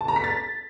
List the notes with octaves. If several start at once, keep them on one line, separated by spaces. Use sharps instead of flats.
A5
A#5
B6
A6